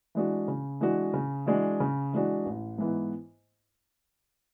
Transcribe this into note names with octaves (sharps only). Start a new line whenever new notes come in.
E3 G#3 D4 F#4
C#3
E3 G#3 D4 F#4
C#3
E3 G#3 D4 F#4
C#3
E3 G#3 D4 F#4
A1
G#2 E3 B3